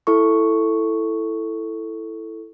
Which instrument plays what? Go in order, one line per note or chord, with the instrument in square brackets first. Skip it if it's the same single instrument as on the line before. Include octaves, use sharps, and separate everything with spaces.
[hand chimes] E4 A4 C#6